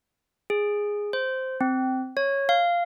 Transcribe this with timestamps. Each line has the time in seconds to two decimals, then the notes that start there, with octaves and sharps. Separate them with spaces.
0.50 G#4
1.13 C5
1.61 C4
2.17 C#5
2.49 F5